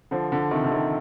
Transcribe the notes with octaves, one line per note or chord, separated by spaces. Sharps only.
D3 F3
D3
C3 D#3
D3
C3 D#3